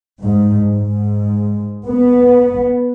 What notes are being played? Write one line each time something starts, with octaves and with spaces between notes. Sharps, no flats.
G#2
G#2
B3